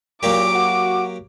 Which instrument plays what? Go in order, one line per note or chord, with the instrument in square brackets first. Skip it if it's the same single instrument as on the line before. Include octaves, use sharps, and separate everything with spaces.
[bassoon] A#2 [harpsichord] F#3 A#3 G4 [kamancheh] D6
[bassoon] F#4